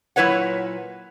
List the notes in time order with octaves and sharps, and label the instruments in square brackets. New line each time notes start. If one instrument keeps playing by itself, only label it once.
[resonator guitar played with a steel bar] A#2 F#3 E4 B4 C#5 F#5